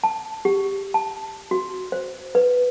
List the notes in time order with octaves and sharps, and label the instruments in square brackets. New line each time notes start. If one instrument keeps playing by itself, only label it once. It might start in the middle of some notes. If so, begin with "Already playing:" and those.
[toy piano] A5
G4
A5
F#4
C5
B4